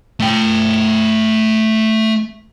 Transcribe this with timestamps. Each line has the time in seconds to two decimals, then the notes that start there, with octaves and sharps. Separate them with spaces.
0.20 A3 G5